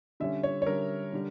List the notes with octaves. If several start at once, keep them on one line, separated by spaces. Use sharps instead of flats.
D3 G3 C#4 E5
C#5
C#5
D3 G3 C#4 A#4
D3 G3